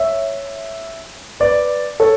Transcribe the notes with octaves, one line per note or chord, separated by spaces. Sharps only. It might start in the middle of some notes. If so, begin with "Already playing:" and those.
Already playing: C#5 E5
B4 D5
A4 C#5